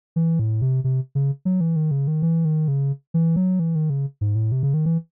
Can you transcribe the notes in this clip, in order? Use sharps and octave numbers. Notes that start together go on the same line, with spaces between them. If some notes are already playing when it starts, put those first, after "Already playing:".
E3
A2
C3
C3
C#3
F#3
E3
D#3
C#3
D#3
E3
D#3
C#3
E3
F#3
E3
D#3
C#3
G#2
A2
C3
C#3
D#3
E3